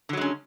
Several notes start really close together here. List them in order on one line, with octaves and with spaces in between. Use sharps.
D3 F#3 G#3 C#4